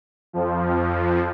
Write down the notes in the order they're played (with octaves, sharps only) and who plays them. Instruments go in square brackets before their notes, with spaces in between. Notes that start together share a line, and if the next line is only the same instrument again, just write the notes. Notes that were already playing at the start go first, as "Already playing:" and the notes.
[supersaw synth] F2 F3